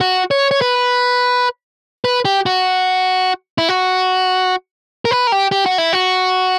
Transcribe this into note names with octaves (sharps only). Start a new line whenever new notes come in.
F#4
C#5
C#5
B4
B4
G4
F#4
E4
F#4
A#4
B4
A#4
G4
G4
F#4
E4
F#4